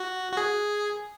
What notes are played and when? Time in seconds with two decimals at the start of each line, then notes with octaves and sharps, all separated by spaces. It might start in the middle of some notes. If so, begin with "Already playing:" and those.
Already playing: F#4
0.32 F#4
0.37 G#4